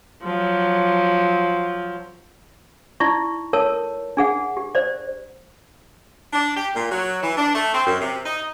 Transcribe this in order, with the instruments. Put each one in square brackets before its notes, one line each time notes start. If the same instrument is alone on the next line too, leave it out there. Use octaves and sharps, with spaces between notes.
[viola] F3 F#3
[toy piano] D#4 E4 D5 C#6
A4 A#4 C#5 A5 E6
D4 G#4 F#5
G4
C5 D5
[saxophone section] D4
G4
A#2
F#3
E3
D4
A3
C4
F#2
C3
D#4